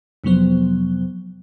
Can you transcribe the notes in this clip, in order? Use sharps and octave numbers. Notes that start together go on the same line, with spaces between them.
F2 C3 F3 F#3 B3 C5